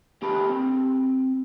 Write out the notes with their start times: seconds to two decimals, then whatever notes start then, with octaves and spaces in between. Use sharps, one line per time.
0.22 D3 G#3 G4 G#4 A5 B5
0.50 C4